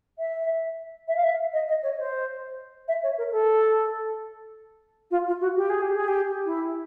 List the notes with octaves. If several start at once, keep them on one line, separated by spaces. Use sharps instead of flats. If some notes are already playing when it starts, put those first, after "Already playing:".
E5
E5
F5
E5
D#5
D#5
C#5
C5
E5
C#5
A#4
A4
F4
F4
F#4
G4
G#4
G4
G#4
G4
E4